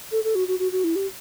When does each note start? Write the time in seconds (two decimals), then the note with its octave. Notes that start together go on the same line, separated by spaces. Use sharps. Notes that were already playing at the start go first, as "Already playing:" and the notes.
0.12 A4
0.24 A4
0.35 F#4
0.48 F#4
0.59 F#4
0.72 F#4
0.84 E4
0.95 G4